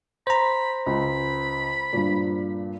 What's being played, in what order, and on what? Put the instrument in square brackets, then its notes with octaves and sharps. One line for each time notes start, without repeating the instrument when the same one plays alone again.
[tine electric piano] C5 A#5 [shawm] B5
[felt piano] C#2 [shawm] B5
[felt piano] G2 A#2